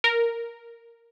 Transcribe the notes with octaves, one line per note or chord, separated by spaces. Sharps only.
A#4